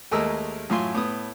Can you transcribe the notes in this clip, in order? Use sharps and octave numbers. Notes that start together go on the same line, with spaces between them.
D#2 G#3 A3 A#4 D#5 E6
F#2 A2 F4 G#5 C6
A2 B3 D#6